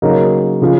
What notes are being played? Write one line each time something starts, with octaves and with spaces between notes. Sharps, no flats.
C#3 F#3 A#3 D#4
C#3 F3